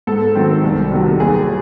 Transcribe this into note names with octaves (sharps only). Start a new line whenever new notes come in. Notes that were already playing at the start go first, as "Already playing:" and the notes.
G#2 A4
D#3 F#3 C4
C2
C3 D#3 F#3
D#2 G#4